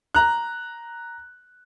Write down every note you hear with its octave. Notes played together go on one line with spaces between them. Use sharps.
A#5 F#6